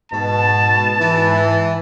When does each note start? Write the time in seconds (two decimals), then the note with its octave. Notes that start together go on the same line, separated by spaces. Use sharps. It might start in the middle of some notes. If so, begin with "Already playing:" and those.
0.12 G#2 B2 A5
1.00 E3